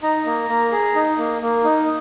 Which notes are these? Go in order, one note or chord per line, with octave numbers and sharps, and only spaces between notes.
D#4 A#5
A#3
A#3
G#4
D#4
A#3
A#3
D#4